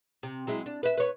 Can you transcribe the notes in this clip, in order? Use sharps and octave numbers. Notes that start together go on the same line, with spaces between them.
C3
F#3 G#3 E4
D4
B4 E5
B4 C#5